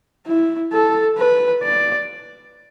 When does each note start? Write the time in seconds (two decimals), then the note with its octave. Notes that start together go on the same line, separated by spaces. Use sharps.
0.27 E4
0.72 A4
1.18 B4
1.63 D5